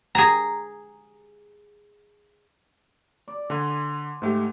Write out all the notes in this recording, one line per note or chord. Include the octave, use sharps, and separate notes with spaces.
G#4 A#5
D5
D3 G#5 C6
G#2 A3 G4